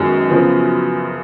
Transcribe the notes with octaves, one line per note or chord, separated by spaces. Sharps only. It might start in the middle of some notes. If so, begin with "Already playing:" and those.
Already playing: F#2 D#3 G#3 B3
C#3 F3 B3